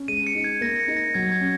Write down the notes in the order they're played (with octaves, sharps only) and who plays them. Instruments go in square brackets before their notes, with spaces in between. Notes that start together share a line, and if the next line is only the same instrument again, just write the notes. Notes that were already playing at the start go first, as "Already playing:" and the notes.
Already playing: [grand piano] C#4
[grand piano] G#3 [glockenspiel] D#7
[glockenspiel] C#7
[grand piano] D#4
[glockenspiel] G#6
[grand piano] A#3 [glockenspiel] A#6
[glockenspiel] C#7
[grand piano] D#4
[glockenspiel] A#6
[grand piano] F#3 [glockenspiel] G#6
[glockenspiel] G#6
[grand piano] C#4